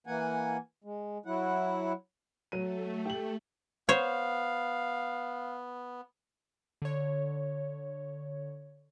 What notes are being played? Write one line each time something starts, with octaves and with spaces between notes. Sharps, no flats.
E3 A#3 F#5 G#5
G#3
F#3 E4 F#5
F#3 A3 D#7
G4 F#7
B3 C5 C#5 F5
D3 C#5